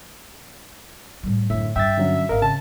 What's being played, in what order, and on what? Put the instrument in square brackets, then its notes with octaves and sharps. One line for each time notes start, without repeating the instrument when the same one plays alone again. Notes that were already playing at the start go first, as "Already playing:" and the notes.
[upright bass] A2 G3
[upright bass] F#2 D3 [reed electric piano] A2 [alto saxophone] E5
[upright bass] G2 [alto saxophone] E5 [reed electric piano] G5 E6 A6
[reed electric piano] D3 F#3 C#4
[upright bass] G#1 [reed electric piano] A#4 D#5 F5
[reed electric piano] C#3 [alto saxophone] A5